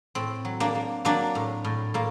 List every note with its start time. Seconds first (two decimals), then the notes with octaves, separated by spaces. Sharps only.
0.15 A2 C4
0.45 F#3
0.60 A#3 D4
0.75 A#3
1.05 F#3 A#3 D4
1.35 A2
1.64 A2
1.94 A2 A#3